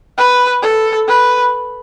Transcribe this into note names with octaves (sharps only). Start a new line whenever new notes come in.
B4
A4
B4